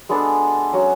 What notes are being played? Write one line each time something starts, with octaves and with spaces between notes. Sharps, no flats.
G#3 B3 D4 A4
F#3 C#4 F#4